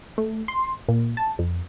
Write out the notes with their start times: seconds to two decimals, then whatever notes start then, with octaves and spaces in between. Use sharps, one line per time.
0.18 A3
0.48 C6
0.88 A#2
1.17 A5
1.39 F2